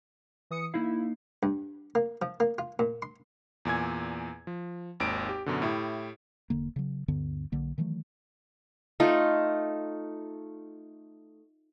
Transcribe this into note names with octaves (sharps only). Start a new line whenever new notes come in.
E3 D#6 C#7
A#3 D#4 E4 F5
G2
A#3
F3
A#3
F4
A#2
C6
E2 A#2 G#5 G#6
F3
G#1 D#2 D7
G4
F#2 B2 D3
A2 E4 G4
E1 D3 A#3
C#3 F#3
D2 G2 D3 B3
B1 D3 A#3
D#3 E3 F#3 A3
A3 D#4 F4